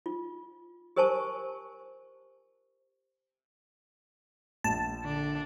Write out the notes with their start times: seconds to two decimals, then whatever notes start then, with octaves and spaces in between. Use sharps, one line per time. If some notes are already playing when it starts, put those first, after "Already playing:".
0.06 F4
0.96 G4 A#4 C5 G#5 A5 C#6
4.64 A#1 A5
5.05 D3 D4